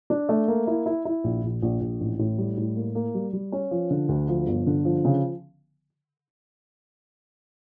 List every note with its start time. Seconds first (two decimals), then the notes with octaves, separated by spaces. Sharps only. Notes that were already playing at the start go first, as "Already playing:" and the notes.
0.10 D4
0.29 A3
0.48 A#3
0.67 E4
0.86 E4
1.05 E4
1.24 A#1
1.43 A#1
1.62 A#1
1.81 A#1
2.00 A1
2.19 A2
2.38 G3
2.57 A2
2.76 A#3
2.95 A#3
3.15 G3
3.33 G3
3.52 C#4
3.71 F3
3.91 D3
4.09 D2
4.29 F3
4.47 G1
4.67 D3
4.85 F3
5.05 C#3